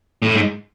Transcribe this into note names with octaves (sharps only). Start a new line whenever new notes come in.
A2
G#2